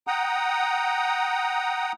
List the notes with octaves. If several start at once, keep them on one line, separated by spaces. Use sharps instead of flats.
F#5 G5 A#5 D#6